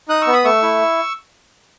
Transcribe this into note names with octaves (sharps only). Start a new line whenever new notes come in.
D#4 D#6 F#6
C#6 E6
B3
B5 D#6
A3 C#6 E6
E4